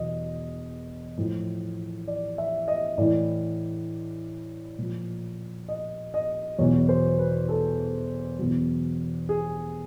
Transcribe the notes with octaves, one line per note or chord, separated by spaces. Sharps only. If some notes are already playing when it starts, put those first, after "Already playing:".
Already playing: E2 B2 F#3 D#5
A2 F3
D5
E5
D#5
A2 E3 D5
A#2 F3
D#5
D#5
E2 B2 F#3 C#5
C5
B4
A4
E2 B2 F#3
G#4